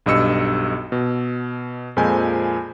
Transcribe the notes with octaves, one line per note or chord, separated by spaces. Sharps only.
B1 G2 D#5 E6 C#7
B2
F2 A#2 F3 G#3 G#5 G6